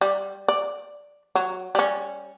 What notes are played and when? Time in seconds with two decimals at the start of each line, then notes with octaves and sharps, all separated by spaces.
0.01 G3
0.48 D5
1.35 F#3
1.75 G3 C#4